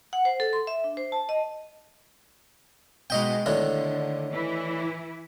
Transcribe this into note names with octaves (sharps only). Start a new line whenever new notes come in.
F#5
C5
A4
C6
E5
D4
C5
A5
D#5
B2 G#3 B3 D#4 D#5 G5
A2 D3 D#3 D4
E3 E4